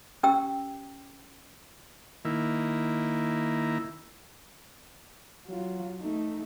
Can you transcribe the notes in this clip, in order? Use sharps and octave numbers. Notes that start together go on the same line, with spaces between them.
C#4 G4 G5 E6
D#3 A#3 E4
F#3 F4
A3 D#4